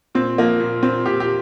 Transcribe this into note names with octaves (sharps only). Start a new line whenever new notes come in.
A#2 C4
F3 A#3
A#2
A#2 C4
A#2 G4
G4